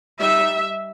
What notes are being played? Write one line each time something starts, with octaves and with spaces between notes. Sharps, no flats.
G3 D#4 E5